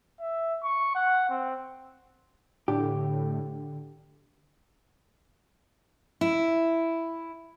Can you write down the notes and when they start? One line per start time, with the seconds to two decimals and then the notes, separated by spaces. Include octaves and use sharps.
0.20 E5
0.64 C#6
0.95 F#5
1.29 C4
2.68 A2 D3 G4
6.21 E4